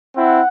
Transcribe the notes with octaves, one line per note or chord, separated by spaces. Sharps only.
C4 E4 F#5